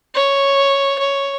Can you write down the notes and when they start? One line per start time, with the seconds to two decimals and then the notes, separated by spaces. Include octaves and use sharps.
0.15 C#5
0.99 C#5